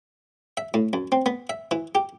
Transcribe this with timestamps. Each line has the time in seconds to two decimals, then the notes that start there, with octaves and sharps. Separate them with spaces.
0.57 E5
0.74 A2
0.93 F#2
1.12 C4
1.26 B3
1.49 E5
1.71 E3
1.95 G4